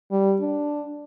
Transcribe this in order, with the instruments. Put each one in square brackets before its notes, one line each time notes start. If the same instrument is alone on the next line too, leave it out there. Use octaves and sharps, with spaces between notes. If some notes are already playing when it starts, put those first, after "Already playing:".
[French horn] G3
D4